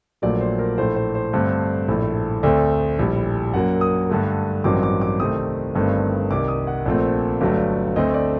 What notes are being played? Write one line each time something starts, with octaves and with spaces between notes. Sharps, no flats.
A#1 A#2 F#3 A3 D5
C5
A#4
A#1 A2 A3 C5
C5
C5
G2 D3 A3 C4
A#1 A2 A3
D2 D3 A3 C4 D5
A#1 A2 G3
F#2 F#3 A#3 F#5
D#6
G2 D3 A3
A1 G2 D#3 F#3 C4 D6
D6
D6
C2 C3 D#3 A3 C4 D#6
G1 G2 D#3 A3 C4
C2 C3 D#3 D6
D#6
F#5
A#1 A#2 A3 C4
G1 G2 F#3 A3
D2 D3 A3 C4 D#5
D5